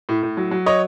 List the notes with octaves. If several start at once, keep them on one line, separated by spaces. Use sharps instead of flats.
A2
A2
F#3
F#3
C#5 D#5